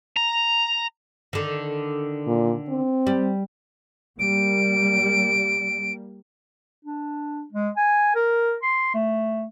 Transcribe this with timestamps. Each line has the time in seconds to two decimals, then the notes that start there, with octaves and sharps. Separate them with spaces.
0.17 A#5
1.33 D3 D#3
2.27 A#2
2.69 C4
3.07 G3
4.19 G3 A#3 D7
6.85 D4
7.52 G#3
7.77 G#5
8.15 A#4
8.62 C6
8.94 A3